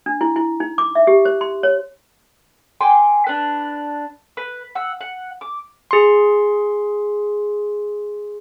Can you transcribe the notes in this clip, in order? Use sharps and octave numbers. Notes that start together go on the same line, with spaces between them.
D4
E4
E4
D#4
D6
E5
G4
C5
C6
C#5
G5 G#5 C6 D6
D4 B4
B4
F#5 E6
F#5
D6
G#4 C6